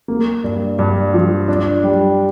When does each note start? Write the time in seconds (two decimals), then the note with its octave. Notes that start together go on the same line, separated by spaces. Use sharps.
0.08 A#3
0.44 G2
0.79 G2
1.14 F3
1.48 D4
1.83 G3